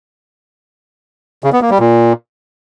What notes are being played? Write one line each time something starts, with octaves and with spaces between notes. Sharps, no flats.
C#3
B3
A#3
G3
A#2